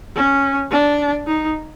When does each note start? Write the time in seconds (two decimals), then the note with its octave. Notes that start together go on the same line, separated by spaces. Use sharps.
0.16 C#4
0.71 D4
1.27 D#4